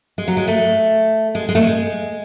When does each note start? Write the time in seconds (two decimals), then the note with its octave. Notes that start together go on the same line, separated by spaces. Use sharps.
0.18 G#3
0.28 F#3
0.37 G#3
0.48 A3
1.35 G#3
1.49 G#3
1.55 A3
1.61 G#3